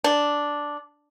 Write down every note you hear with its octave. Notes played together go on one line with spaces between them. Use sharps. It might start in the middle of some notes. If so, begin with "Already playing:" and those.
D4